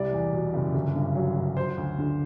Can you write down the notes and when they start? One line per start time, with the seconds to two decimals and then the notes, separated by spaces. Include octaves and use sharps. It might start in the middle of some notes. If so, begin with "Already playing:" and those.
Already playing: C2 G3 D5
0.13 E2
0.33 B2
0.54 F#1
0.74 G1
0.96 G2
1.15 F#3
1.36 G1
1.56 F#3 C5
1.77 D2
1.98 D3